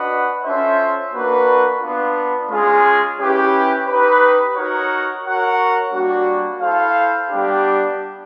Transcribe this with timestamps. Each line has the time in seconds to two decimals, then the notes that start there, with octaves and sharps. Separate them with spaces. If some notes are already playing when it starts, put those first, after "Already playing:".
Already playing: D4 F#4 B4 D#5 F#5
0.43 C#4 F4 A4 C5 E5
1.12 A#3 D4 F#4 B4
1.81 B3 D4 F4
2.49 G#3 C#4 F4 G#4
3.18 C#4 E4 G4 B4
3.87 D#4 G4 B4
4.56 D#4 F#4 A#4 C#5 F#5
5.25 F#4 A#4 C#5 F#5
5.93 G3 A#3 D4 F#4
6.62 E4 A4 C5 F5
7.31 G3 B3 D4 G4